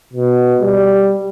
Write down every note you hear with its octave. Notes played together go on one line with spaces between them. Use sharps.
B2
G3